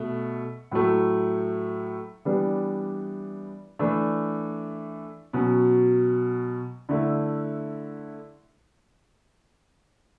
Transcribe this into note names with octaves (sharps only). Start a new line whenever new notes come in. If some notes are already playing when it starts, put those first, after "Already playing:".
Already playing: B2 A3
A2 F#3 A3
E3 G3 B3 D4
E3 A3 D4
B2 F#3 C#4
D3 A3 E4